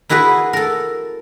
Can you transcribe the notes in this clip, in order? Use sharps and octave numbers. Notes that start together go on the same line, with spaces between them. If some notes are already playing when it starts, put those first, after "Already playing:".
A#3 E4 F#4 G#4 B4
A4 A#4